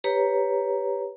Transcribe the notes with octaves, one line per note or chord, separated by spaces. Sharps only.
G4 B4 C#5 A#5